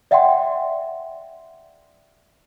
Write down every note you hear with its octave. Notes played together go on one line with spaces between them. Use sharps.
D5 E5 F#5 G5 C6